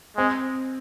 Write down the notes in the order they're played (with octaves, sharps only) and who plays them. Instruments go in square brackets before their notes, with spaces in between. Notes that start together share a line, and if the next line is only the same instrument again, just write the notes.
[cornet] G#3 [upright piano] C4